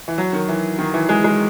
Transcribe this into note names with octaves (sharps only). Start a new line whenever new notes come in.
E3
F#3
D#3
E3
D#3
E3
G#3
G#3